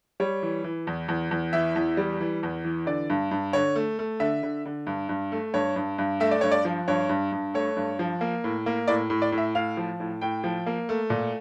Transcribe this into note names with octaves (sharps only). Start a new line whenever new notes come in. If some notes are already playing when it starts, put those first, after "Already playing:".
G3 C#5
E3
E3
E2
E2
E2
E3 E5
E2
G3
E3
E2
E3
D3 D5
G2
G2
D3 C#5
A3
A3
D3 E5
D3
D3
G2
G2
A3
G2 C#5
G2
G2
A3 E5
D5
G2 C#5
D5
F3
G2 C#5
G2
G2
A3 C#5
G2
F3
A#3
A2
A#3
A2 D5
A2
D5
A2
E5
A2 F5
F3
A2
A2 G5
F3
A#3
A3
A#2